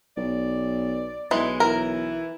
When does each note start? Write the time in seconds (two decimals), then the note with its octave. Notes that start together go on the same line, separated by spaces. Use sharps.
0.17 B1 D5
1.31 B1 E3 G#3
1.60 E3 A#4